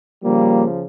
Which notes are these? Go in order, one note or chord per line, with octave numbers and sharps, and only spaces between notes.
C#3 F3 G3 A#3